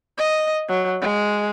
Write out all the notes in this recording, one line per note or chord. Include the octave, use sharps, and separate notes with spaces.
D#5
F#3
G#3